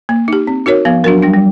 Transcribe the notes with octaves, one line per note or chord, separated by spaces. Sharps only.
A#3
D#4 G4
C4
D#4 F#4 A#4 C#5
F3 B3
F#3 D4 F#4 A#4
G3 D4
G3